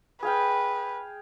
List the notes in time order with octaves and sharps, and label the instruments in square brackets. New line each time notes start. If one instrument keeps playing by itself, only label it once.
[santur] G#4 F5 G5 [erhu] B4